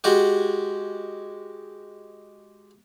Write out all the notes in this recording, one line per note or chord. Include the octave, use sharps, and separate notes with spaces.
G#3 F#4 G4